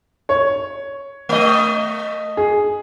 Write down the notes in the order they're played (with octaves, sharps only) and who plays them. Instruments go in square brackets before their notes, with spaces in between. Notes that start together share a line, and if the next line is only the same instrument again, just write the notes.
[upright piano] C#5
[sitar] A3 D#5
[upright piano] G#4